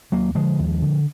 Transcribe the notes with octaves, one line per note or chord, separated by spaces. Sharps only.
D#2 F#3 A#3
D3 F3 G#3
D#2
D3